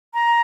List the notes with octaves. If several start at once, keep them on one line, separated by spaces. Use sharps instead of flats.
A#5